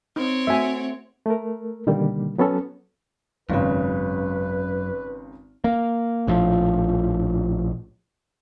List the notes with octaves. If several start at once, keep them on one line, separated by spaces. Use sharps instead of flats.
C4 D#4 C#5
A3 F#4 E5 G#5
A3 A#4
B2 D3 D#3 G3 A#3
F#3 B3 C#4 A4
G#1 F#2 C#3 F#3 B4
A#3
A#1 A2 F3